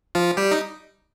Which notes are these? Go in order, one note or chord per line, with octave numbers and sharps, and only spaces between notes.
F3 F4
G3 G4
D#4